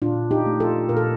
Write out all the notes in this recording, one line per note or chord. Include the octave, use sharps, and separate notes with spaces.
A#2 D4 F4
D#4 G4
A3
F4 A4
A#2 A#4
A4